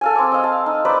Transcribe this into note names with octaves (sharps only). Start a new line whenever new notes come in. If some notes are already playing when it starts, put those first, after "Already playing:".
A4 F5 G#5
C4 D6
D#5 F5
A5
D#4
B4 C5 D5 A#5